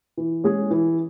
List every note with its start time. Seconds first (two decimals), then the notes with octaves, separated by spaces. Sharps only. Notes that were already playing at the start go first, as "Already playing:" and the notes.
0.17 E3
0.44 G#3 C#4 G#4
0.71 E3